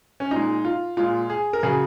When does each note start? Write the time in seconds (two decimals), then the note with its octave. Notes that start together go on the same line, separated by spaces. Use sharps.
0.20 C#4
0.31 A#2 G#3 D#4
0.65 F4
0.97 A#2 G#3 F4
1.30 G#4
1.53 A#4
1.63 C#3 F#3 G#4